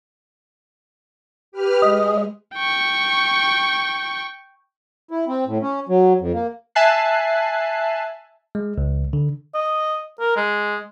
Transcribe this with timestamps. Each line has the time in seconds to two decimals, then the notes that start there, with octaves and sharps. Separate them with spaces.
1.52 G4 B4 F6
1.82 G#3 D#5
2.54 G5 C#6
5.11 E4
5.28 C4
5.47 A2
5.62 C#4
5.89 F#3
6.21 F2
6.34 A#3
6.75 E5 G#5 A5 F#6 C7
8.55 G#3
8.78 C#2
9.13 D3
9.54 D#5
10.20 A#4
10.36 G#3